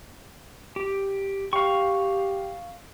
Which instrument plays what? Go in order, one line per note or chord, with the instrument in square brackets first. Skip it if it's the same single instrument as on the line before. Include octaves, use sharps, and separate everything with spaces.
[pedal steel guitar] G4
[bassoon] G4 [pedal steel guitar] F5 C#6